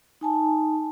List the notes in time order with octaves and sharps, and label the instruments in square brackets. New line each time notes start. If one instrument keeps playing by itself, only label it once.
[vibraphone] D#4 G#5 A5